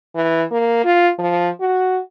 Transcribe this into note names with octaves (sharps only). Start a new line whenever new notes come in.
E3
A#3
F4
F3
F#4